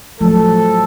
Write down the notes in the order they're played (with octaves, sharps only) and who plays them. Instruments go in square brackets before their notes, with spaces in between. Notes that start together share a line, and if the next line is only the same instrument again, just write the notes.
[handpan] F3 F#3 A3 [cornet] A4